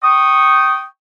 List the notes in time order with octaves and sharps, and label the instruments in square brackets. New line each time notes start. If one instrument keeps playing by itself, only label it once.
[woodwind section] G5 C#6 D#6